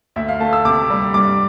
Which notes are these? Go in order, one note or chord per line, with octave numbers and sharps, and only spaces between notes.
D2 E5
F5
A3 A5
E6
C3 D6
G3
G2 D6